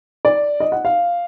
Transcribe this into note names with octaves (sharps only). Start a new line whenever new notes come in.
D5
D#5
F#5
F5